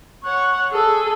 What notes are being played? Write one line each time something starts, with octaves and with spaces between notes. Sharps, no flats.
C#5 F#5
G#4 A4